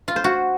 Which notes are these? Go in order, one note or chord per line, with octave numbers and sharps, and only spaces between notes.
F4
C5
F#4